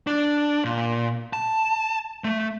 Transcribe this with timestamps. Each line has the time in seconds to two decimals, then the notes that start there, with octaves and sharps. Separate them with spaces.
0.07 D4
0.65 A#2
1.33 A5
2.24 A3